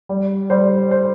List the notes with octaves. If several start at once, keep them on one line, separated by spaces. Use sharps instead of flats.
G3
G3 C5
C5